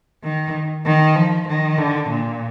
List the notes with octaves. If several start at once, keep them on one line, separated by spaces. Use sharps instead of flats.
D#3
D#3
F3
D#3
D3
A#2